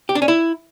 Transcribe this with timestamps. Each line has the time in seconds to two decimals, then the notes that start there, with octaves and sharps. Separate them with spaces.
0.09 G4
0.15 D4
0.22 C#4
0.28 E4